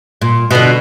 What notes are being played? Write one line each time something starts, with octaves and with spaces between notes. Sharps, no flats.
A#2
B2 D3